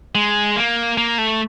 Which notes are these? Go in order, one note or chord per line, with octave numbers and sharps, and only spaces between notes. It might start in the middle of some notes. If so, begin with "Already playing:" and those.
G#3
A#3
A#3
A3